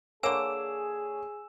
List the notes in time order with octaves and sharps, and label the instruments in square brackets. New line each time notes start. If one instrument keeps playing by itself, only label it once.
[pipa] D3 A#3 [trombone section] G#4 [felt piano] C#5 [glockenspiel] G#5 E6 E7